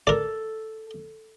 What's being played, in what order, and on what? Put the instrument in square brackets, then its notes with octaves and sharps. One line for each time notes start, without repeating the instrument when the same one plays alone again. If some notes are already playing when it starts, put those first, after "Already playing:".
[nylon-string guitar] A4 [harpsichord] A#4 D5